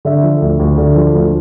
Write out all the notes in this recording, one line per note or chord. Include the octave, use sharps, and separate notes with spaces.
D3 E5
F3
D2
D2
D3
F3
D2